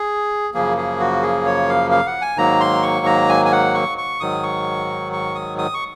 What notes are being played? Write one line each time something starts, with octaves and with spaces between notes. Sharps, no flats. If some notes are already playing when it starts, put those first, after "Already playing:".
Already playing: G#4
F#2 C#3 F3 A#3 G#4
G#4
F#4
G#4
C#5
F5
F5
F#5
G#5
G#2 D#3 F#3 A#3 A#5
C6
C#6
A#5
G#5
G#5
F#5
C#6
C#6
G#2 D#3 F#3 D#6
C#6
C#6
D#6
D#6
C#6